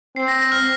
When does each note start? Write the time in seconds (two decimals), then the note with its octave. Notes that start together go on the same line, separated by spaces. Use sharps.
0.16 C4 C7
0.28 A#6
0.40 A#6
0.52 F6